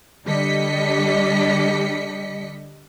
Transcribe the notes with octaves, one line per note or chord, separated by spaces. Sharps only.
D3 G3 D4 D#5 B6 C#7